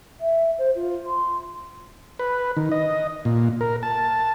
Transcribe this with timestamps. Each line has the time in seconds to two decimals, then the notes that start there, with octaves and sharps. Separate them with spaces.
0.21 E5
0.58 C5
0.75 F4
1.07 C6
2.19 B4
2.57 D#3
2.72 D#5
3.25 A#2
3.61 A#4
3.83 A5